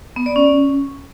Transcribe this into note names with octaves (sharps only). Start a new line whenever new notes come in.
B3
D5
C#4